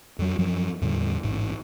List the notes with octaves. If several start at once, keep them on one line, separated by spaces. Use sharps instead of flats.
F2 F#3
F#2 F3 F#3
E2 A2 D3 G3
A1 G#2